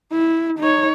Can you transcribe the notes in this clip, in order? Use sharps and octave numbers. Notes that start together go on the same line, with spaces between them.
E4
D#4 C#5